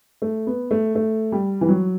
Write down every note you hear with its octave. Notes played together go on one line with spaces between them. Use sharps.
A3
B3
A3
A3
G3
E3
F#3